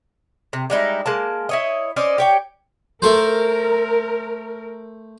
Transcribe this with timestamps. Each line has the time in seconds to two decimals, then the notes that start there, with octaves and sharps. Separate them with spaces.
0.53 C3
0.70 G3 G#3 D#4 E4
1.06 G#3 A#3 A5
1.49 E4 C#5 D#5
1.96 C#4 C5 D5 D#5
2.18 G4 C#5 G5
3.02 A3 A4 A#4 C5